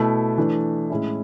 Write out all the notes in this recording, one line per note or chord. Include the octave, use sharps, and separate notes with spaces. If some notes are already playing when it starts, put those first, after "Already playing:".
Already playing: B2 A3 E4
E3 A3 D4
A2 G#3 C#4 E4